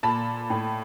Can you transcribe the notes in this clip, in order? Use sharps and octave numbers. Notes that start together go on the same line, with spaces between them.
A#2 A5 B5
A2